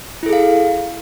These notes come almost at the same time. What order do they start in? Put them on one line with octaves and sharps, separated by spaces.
E4 A4 G#4 F5